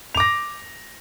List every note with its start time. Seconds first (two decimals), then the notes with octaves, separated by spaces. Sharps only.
0.15 F7
0.17 D6
0.20 A#6